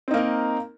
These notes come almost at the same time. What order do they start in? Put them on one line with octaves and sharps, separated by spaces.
C4 D#4 A#3 A#4